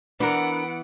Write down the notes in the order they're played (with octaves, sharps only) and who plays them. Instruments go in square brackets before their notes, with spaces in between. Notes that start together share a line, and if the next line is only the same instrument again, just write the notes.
[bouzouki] E3 B3 [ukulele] D4 A#4 [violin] F#5 D7